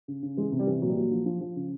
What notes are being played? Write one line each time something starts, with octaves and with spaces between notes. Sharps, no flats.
C#3
C#3
E3 G#3
C3
G3
E3
A#2 F#3
G3
A#2 F#3
F3
F3
F3
C#3